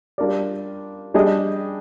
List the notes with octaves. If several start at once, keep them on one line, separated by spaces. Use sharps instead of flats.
G3 D4 F4 A#4 D5
G3 D4 G#4 D#5